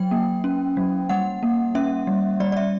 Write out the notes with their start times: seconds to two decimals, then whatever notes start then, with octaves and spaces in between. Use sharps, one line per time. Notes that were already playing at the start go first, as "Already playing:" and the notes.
Already playing: F#3 G5
0.11 A#3
0.44 C#4
0.77 F#3
1.09 G3 F#5
1.43 A#3
1.75 C#4 E5
2.07 G3
2.40 G3 D5
2.52 D5
2.57 E5